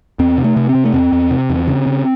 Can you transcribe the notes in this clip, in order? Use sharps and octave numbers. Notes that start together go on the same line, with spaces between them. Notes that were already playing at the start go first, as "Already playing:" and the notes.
E2 C4
C3
A3
C3
C4
C3
A3
E2 C4
E2
C3
E2
C#3
C#3